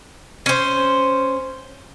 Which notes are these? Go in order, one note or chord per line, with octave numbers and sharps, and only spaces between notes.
C#4 C5